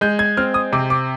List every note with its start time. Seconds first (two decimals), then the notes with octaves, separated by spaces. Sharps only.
0.01 G#3 G6
0.19 G#6
0.37 C4 F6
0.54 D#6
0.73 C3 D6
0.90 D6